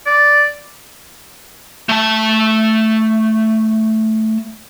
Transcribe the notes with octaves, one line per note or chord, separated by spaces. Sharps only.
D5
A3 A5